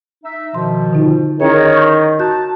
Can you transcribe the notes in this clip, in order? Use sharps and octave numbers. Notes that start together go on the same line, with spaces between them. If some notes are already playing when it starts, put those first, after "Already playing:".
D#4 E5
B2 D#3 F3 C6
D3 D#4 F4
D#3 C#4 E4 G#4 C#5
C#6 G6
F#4 A5 F#6 G6